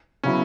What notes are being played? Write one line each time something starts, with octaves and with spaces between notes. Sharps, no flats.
C#3 F#3 B3 C#4 E4